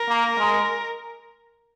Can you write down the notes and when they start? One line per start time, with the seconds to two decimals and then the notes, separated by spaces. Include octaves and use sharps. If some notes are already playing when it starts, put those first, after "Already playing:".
Already playing: A#4
0.09 A#3
0.39 G#3